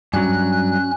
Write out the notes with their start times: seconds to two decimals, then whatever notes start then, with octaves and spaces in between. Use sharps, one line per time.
0.14 G2 F#3 C#4 F#6